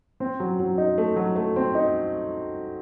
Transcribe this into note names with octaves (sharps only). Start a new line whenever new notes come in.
C4
F#3
F#3
D#4
A3
F#3
A3
C4
D#4